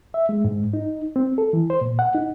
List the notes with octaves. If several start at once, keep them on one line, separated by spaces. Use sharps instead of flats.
E5
G#3
G#2
D#4
C4
A4
E3
C5
A#2
F#5
D#4